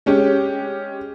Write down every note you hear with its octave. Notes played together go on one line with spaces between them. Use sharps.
G#3 C#4 G4